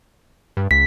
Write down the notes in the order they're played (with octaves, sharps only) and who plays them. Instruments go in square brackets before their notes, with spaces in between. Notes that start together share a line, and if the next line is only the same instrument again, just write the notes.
[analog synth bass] G2
[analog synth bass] C#2 [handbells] B6